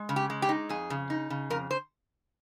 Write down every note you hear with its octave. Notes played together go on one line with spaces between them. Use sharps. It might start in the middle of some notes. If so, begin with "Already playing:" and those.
Already playing: G#3
C#3
G4
G#3
G4
D#4
F2 G#4
C#3
D#4
C#3
F2 A#4
C5